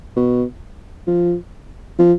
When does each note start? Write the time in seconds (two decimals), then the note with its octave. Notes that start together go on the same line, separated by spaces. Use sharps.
0.16 B2
1.07 F3
1.99 F3